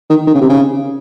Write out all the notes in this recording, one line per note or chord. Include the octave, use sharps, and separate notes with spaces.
D#3
D#3
C#3
C3
C#3